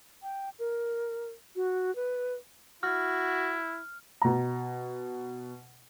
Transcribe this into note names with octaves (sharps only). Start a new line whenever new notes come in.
G5
A#4
F#4
B4
E4 F#4 F6
B2 A#5